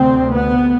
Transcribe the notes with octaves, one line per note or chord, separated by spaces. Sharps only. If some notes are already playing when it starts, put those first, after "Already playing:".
Already playing: D2 C3 C4
B3